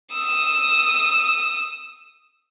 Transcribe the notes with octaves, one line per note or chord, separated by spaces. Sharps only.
D#6 E6